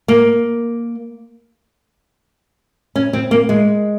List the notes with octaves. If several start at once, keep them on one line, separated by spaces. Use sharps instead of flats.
A#3
C#4
C4
A#3
G#3